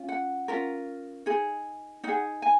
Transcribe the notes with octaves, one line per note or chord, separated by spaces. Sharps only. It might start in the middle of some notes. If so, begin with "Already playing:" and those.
Already playing: C#4 F4
F#5
C#4 F4 A#4
D#4 G#4
D#4 G#4 F#5
G#5